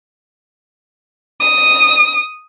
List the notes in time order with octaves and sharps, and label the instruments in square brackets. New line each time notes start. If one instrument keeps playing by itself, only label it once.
[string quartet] D#6